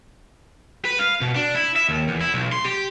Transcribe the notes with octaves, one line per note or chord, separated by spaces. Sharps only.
B4
F5
B2
D4
E4
E5
D#2
E2
E4
B1
C6
G4